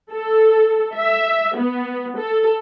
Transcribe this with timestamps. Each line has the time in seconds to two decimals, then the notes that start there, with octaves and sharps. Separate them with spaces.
0.12 A4
0.95 E5
1.57 B3
2.18 A4